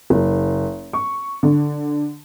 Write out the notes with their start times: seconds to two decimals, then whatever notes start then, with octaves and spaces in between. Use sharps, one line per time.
0.10 F#1
0.93 C#6
1.43 D3